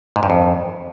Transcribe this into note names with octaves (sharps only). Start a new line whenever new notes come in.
G#2
G2
F2